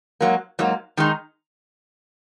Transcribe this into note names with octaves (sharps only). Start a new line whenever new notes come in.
G#2 F#3 A#3
G#2 F#3 A#3
D#3 G#3 D#4